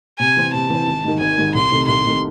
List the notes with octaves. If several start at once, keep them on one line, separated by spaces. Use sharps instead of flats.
C3 G#5
E3 C4
C3 A5
E3 C4
G#1
G#2 D#3
G#1 G#5
G#2 D#3
C2 C6
C3 D#3 A3
C2 C6
C3 D#3 A3